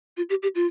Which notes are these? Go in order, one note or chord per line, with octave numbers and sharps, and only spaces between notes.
F4
G4
G4
F4